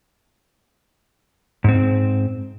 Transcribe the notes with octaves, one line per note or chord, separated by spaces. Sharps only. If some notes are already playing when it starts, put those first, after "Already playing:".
G#2 C4